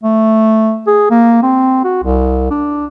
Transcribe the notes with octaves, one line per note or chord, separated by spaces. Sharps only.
A3
G#4
A#3
C4
F#4
C2
D4